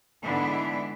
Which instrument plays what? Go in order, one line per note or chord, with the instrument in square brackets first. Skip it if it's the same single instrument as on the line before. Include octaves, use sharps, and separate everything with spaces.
[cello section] G#2 D3 E3 B3 D4 E4